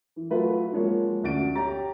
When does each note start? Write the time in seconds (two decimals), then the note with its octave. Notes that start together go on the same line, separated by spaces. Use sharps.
0.16 E3
0.30 F#3 A3 F4 B4
0.73 F3 F#3 G#3 A#3 C#5
1.23 D2 C#4 A6 D7
1.55 G4 C#5 A#5 A6